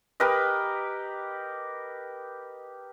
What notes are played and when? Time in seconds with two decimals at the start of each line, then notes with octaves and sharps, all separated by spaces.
0.20 G4 A#4 B4 D#5